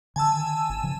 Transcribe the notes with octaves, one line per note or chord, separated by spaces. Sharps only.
D3 D#3 G#5 A5 E6
G#1
C#3 F3